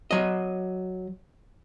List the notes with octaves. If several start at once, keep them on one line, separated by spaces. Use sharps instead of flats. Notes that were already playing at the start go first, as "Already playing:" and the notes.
F#3 D#5